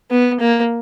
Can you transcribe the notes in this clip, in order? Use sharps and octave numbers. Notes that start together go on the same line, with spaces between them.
B3
A#3